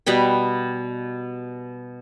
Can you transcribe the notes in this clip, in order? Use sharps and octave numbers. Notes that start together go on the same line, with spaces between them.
B2 G3 B4 G5